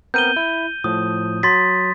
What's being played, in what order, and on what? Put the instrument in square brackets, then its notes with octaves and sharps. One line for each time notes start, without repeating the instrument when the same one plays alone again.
[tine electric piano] B3 C4 A#4 [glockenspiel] G6 D#7 G7
[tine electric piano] E4
[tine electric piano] A2 F3 [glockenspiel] D#6
[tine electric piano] F#3 [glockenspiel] C6 A6 B6